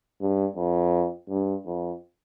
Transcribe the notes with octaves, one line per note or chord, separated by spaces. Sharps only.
G2
F2
G2
F2